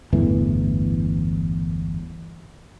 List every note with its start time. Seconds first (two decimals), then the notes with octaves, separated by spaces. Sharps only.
0.13 G1 E2 A2 E3